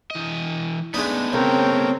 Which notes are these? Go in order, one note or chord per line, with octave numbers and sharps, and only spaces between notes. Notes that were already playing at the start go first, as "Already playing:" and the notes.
E3 D#5
G#3 A3 B3 D4 D#4
C#2 C4 A#4 C#5 G5